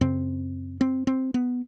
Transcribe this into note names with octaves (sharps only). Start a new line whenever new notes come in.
F#2 C#3 C4
C4
C4
B3